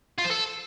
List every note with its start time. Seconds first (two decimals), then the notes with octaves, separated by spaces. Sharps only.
0.18 F4
0.25 C5
0.31 A4